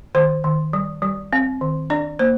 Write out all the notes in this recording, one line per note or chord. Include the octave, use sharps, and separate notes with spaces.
D#3 C5
D#3
G3
G3
C4
D#3
D4 D5
A#3 C5